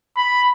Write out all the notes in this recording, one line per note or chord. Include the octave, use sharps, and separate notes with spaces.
B5